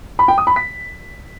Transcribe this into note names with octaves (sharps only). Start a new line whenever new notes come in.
B5
G5
D#6
B5
B6